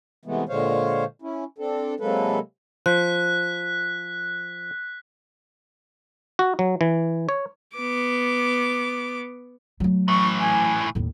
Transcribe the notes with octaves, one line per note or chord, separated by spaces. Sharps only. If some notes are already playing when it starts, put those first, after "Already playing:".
C3 E3 G#3 A3 B3
A#2 D3 G#3 C5 C#5 F5
C#4 E4
C4 D4 A4
C3 F#3 G#3 A#3 A4 B4
F3 C5 F#6 B6
F#4
F#3
E3
C#5
B3 D6
F#3 A3
A2 E3 C#6
G#5
D#2 A2